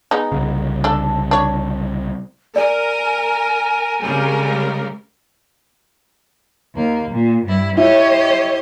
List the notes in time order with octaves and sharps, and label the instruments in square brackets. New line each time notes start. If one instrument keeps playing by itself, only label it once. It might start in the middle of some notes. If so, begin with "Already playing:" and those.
[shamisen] G#3 B3 D#4
[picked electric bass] C2 C#3
[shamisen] D4 A4
D4 C#5
[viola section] A#4 [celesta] D5 [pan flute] G#5
[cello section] C#3 G#3 C4 [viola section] G3 A#4
[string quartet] D#2 A#3
A#2
G2 E4
[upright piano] E4 [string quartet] G4 C#5 D#5